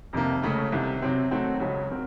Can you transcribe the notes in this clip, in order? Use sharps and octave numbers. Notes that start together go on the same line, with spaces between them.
F2 C3 D#3 A#3
C#2 C#3 A3 C#4
C2 C3 D#3
C3 F#3 C4
D#3 F#3 A3 C4 F#4
C#2 C#3 F#3
C4 F#4 A#4